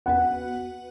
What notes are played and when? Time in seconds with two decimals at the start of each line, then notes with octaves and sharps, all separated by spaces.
0.06 B3 F#4 B4 F#5